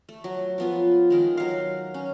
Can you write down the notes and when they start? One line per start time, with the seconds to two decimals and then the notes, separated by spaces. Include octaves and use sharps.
0.09 A3
0.24 F#3
0.58 F3 B3 F4
1.10 D#3 G#3 A#4
1.37 F#3 F5
1.94 C#4